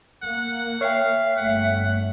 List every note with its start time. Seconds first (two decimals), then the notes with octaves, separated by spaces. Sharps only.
0.23 A#3 F#5
0.81 C#5 E5 F5 G5
1.37 G1 A3 F#5